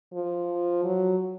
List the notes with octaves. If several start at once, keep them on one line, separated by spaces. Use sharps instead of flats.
F3
F#3